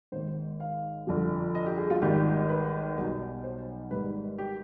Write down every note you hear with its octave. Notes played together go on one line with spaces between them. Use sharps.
G#1 G#2 D#3 C5
F5
G1 F2 D3 F3
D#5
G4
G#4
F4
G#1 G#2 D#3 G3 G4
B4
B1 B2 G3
C5
G#1 G#2 G3 B4
G4